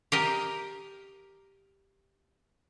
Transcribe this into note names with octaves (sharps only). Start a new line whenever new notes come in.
G4 A#4 D#5